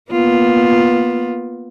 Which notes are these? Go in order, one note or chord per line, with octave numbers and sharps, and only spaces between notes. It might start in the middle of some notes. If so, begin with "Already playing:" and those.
A#3 B3 F4